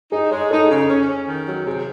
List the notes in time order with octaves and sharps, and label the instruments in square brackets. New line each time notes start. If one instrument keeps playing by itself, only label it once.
[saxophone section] D#4 [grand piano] G#4
[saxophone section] G#3 [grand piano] C#5
[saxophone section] D#4 [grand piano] A4
[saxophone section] C#3 [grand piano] G#4
[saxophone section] C#4
C#4
D#3
F#3
[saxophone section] C3 [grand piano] G#4